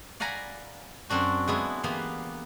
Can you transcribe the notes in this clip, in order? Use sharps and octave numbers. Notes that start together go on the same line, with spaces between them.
D5 F5 F#5 G#5 A#5 B5
F#2 C4 D4 F#4
G#3 B3 E4
E3 A#3 B3 G4 F5